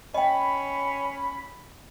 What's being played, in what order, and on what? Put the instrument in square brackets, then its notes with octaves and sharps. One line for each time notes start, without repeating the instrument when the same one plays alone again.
[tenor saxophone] C#4 [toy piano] D#5 G5 [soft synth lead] B5